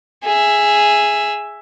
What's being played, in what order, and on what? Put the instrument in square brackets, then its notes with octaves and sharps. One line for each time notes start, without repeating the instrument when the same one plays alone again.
[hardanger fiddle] G#4 E5